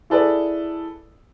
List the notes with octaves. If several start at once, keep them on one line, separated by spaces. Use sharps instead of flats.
E4 G#4 A4 B4 D5